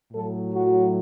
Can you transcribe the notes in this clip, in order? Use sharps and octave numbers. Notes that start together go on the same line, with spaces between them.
A2 F#3 A4
F#4